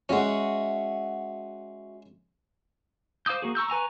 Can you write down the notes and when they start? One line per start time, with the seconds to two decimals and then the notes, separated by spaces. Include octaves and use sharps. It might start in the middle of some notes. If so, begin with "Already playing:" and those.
0.09 G#3 C#4 F#4 E5 F#5
3.26 C5 F5 D6 D#6 G6
3.42 A#3 F#4 G#4
3.55 A#5 C#6 E6 G6
3.68 B4 G#5 A#5 C#6